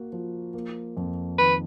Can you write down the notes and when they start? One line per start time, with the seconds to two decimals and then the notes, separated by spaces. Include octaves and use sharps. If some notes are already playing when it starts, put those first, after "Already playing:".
Already playing: A#3 F#4
0.12 F3
0.54 A#3
0.97 F2
1.38 D#3 B4